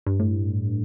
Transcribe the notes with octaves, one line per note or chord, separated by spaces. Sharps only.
G2
A2